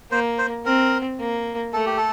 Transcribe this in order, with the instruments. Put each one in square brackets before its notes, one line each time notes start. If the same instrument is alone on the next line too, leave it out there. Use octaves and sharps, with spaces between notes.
[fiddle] A#3 [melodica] C5
[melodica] C5
[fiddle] C4 [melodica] A#4
[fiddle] A#3
[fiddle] A3 [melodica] A4
[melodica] G4
A4